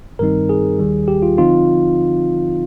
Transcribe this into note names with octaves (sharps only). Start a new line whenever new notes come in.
G2 D#3 G3 C4 D#4 A#4
G#4
D#2 D#3 G3
G4
F4
D3 F3 C4 D#4 F4